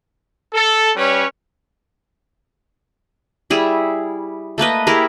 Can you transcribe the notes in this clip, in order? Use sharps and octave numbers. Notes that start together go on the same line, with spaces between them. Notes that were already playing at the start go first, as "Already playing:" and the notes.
A4
G3 C#4 B4 C#5
G3 E4 G#4
A3 A#3 B4 D#5
E4 G4 G#4 A#4